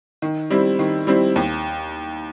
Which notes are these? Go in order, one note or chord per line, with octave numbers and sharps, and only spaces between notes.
D#3
G3 C4 E4
D#3
G3 C4 E4
D#2